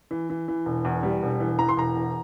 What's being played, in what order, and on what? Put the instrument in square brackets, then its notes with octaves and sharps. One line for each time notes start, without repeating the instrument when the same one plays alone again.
[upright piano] E3
E3
E3
E1
E2
G3
E1
E3
E3 A#5
C6
E1 A#5
E2